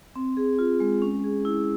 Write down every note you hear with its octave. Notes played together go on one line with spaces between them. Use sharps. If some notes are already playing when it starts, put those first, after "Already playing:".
C4
G#4
F4
G#3
C#4
G#4
E4